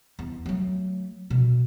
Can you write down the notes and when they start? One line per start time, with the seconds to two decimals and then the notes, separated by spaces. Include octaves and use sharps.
0.19 E2
0.46 F#3 A3
1.30 B2